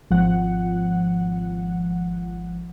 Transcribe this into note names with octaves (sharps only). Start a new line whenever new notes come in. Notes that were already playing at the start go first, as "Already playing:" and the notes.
G#1 F3 F#5